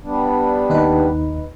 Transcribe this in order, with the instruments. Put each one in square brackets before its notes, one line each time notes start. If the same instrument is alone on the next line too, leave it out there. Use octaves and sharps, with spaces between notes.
[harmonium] G3 B3 D4
[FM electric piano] D#2 D#4 B4